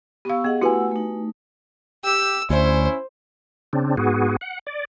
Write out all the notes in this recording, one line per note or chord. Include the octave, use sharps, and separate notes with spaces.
B3 G4 F5 C#6 E6
B3 G#4 D#5 F#5
A3 E4 F#4 G4 B4 F#5 G#5 E6
A3 D#4
G4 E6
D2 C#4 E4 C5
C#3 C4 D4
G#2 B3 F#4 G#4
F#5
D5